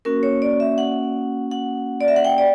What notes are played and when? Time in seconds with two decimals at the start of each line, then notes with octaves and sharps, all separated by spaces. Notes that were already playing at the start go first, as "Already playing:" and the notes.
0.05 A#3 C#4 F#4 A#4
0.23 C#5
0.42 D5
0.60 E5
0.78 F#5
1.51 F#5
2.01 D5
2.08 E5
2.16 F#5
2.25 G5
2.38 D5